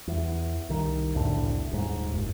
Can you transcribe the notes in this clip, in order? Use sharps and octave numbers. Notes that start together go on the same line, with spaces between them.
E2
C2 D#3
E1 C2 A2 D3
D#1 G#2
F#1